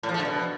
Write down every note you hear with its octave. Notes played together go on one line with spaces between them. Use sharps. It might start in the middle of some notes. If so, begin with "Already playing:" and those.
A2
F3
A3
D3
B2